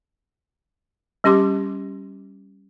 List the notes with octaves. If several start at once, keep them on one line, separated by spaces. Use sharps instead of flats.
G3 C#4 G4 C6 D6